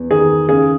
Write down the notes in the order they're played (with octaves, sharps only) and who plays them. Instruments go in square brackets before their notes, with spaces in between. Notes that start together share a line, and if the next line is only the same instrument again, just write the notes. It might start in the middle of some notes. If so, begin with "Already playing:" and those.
Already playing: [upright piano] E2
[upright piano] D#3 [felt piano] G#4
[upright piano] C#3 [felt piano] G#4